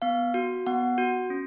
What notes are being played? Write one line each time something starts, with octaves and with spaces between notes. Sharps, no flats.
B3 F5
F#4
B3 F#5
F#4
C#4